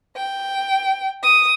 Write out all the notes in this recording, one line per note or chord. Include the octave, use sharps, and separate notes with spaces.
G5
D#6